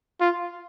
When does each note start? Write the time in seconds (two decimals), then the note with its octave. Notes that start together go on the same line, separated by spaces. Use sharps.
0.21 F4